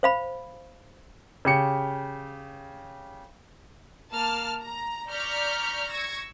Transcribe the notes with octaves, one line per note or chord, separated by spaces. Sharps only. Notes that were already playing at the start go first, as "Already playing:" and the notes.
C5 F5 B5
C#3 G4 C#7
A#3 A5 F6
A#5
D5 A#5 C#6 F6 G6 B6
C#6 E6 G#6 A#6